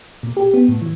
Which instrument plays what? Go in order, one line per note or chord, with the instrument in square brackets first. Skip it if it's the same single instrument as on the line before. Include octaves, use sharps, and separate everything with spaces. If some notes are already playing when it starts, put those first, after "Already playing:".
[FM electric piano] A#2
G4
B3
A2
E3